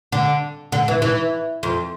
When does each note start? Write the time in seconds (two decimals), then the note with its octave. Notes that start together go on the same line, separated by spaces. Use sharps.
0.12 D3
0.72 D3
0.88 E3
1.02 E3
1.63 F2